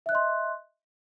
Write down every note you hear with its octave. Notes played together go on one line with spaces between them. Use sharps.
D#5 E5 C6 F#6